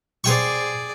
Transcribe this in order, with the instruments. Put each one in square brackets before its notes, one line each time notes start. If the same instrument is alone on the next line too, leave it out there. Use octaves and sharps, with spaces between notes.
[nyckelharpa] G#4 D5 [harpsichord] C5 G5 C#6